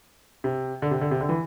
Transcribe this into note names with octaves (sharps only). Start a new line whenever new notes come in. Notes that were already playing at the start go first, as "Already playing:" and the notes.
C3
D3
C3
D3
C3
D3
E3